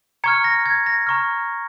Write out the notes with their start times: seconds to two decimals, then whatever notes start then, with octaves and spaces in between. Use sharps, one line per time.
0.24 A#5 C#6 F6 G#6 C#7
0.44 A#6
0.66 G#6
0.86 A#6
1.07 A#5 C#6 F6